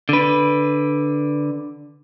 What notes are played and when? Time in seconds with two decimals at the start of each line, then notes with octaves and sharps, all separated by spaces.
0.09 D3 B4